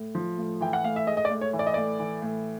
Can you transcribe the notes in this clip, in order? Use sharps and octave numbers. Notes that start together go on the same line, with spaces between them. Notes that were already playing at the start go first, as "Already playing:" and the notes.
Already playing: A2
F3
A2
E3 G5
F#5
A2 F5
E5
G#3 D#5
D#5
D5
A2
C#5
E3
D5
D#5
A2 D5
E3
A2